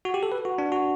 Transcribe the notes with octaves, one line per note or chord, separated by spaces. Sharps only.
F#4
G4
A4
B4
F#4
D4
F#4